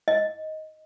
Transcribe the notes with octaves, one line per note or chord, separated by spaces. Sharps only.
D#5